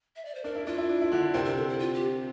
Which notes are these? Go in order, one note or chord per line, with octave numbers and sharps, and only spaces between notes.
E5
D5
C5
D4 A#4
E4
D4 F4
E4
D4
E4
D3 D4
C3 C4 A#4
A#4
A4
E4
F4
G4